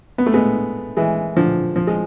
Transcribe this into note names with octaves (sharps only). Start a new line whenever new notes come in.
B3
A3
G#3 B3
E3 G#3
D3 F3
F3
G#3